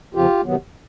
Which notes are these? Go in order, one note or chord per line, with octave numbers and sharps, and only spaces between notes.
F2 C#3 F3 F4 G4
C3 D#3 F#3 B3